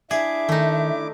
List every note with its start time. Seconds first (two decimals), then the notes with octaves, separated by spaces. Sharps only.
0.11 D4 E4 G#4 E5 D6
0.49 D#3 A3 D#4